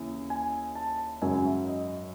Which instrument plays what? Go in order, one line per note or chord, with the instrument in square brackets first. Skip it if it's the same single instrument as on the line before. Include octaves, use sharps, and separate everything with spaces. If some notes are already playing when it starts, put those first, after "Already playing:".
Already playing: [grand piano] D#2 C#3 E3
G#5
A5
G#1 F#2 C#3 F#3 G#5
E5
D#5